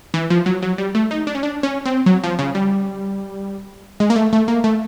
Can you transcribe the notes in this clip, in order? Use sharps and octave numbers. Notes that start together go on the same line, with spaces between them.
E3
F3
F#3
F#3
G3
A3
D#4
D4
C#4
D4
C#4
C4
F#3
F3
C#3
G3
G#3
A#3
A3
A3
A#3
A3